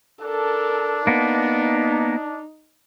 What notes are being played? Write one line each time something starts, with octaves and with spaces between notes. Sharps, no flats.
D4 A4 A#4
A#3 B3 D#4